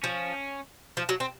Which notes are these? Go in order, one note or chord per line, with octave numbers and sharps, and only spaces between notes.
F3 C#4
F3
F#3
C4